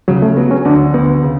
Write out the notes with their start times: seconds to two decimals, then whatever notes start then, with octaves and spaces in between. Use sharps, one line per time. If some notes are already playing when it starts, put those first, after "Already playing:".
0.08 C#3 F#3
0.22 A3
0.37 F#3 B3
0.51 C#4
0.65 D2 D4
0.94 D2 B3
1.23 C#3